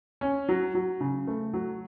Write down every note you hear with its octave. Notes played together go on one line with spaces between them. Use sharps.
C#4
F#3
F#3
C#3
A3
F#3